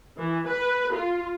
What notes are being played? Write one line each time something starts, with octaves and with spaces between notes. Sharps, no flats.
E3
B4
F4